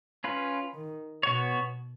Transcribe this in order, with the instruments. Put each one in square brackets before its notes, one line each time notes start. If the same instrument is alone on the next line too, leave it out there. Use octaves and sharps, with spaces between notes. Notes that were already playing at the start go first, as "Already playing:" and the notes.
[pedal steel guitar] C#4 F4 B4
[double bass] D#3
[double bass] B2 [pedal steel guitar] B3 F#4 C#5